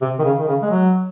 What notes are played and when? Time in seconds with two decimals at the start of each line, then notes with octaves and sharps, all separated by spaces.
0.02 C3
0.19 D#3
0.24 C#3
0.39 D#3
0.48 C#3
0.62 G#3
0.71 F#3